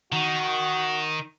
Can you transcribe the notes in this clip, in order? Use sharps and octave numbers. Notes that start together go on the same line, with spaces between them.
D#3 F#4